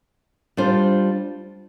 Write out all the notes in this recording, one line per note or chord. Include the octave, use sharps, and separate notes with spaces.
G3 D4 F4 C5